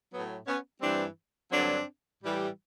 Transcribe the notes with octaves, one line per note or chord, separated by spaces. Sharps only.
A2 F#3 B3
B3 C#4
G2 E3 G3 C4 D4
G2 D3 F#3 C4 D4
A2 E3 G3